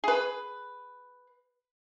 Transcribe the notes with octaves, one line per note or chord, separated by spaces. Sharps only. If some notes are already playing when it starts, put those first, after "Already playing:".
G#4 B4